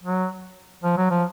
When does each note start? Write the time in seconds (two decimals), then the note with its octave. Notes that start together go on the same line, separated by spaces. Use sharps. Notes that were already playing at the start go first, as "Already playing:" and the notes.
0.03 F#3
0.83 F3
0.97 F#3
1.10 F3